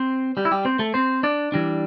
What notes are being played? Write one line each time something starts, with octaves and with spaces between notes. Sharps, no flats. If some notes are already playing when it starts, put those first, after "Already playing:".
Already playing: C4 C5
G3 G4
E4
G3 G4
C4 C5
A3 A4
C4 C5
D4 D5
E3 G3 D4